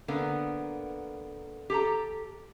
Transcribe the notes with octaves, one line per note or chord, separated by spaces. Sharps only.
D3 A#3 B3
G4 A4 A#5